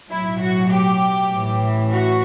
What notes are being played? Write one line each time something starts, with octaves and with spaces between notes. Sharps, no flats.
B1 A2 F#3 E4
F#4
G4
A1 A2 E3
F#4